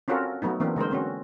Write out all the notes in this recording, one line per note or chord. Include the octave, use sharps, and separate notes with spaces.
C4 C#4 F4 F#4 A4 A#4
F#3 A3 B3 D#4
E3 A#3 C4 D4
D3 G#3 A#4 C5
C4 C#4 F#4